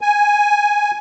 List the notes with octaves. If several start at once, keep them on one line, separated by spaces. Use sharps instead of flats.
G#5